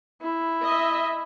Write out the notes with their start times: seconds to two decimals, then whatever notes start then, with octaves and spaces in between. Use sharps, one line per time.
0.22 E4
0.64 D#5 E5